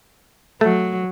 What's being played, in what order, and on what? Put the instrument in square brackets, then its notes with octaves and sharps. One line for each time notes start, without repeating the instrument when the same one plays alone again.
[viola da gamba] F#3 [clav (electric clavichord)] A3